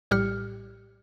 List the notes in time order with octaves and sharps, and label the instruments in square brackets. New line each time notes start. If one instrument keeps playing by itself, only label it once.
[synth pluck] A#1 A2 G3 G4 F6 C#7